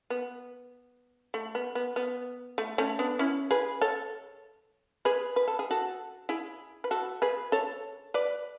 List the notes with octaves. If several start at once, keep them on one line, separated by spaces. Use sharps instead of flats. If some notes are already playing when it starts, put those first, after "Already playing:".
B3
A3
B3
B3
B3
A3
A3 C#4
B3 D4
C#4 E4
G#4 B4
A4 C#5
G#4 B4
B4
A4
G#4
F#4 A4
E4 G#4
B4
F#4 A4
G#4 B4
A4 C#5
B4 D5